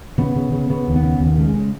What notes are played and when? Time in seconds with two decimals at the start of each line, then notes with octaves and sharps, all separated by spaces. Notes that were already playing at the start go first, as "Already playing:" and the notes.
0.18 C#3 B3
0.36 C#3
0.52 C#3
0.70 C#3 B3
0.87 D#2
0.96 B3
1.03 C#3
1.20 D#2
1.38 C#3 A3
1.47 G#3
1.55 C#3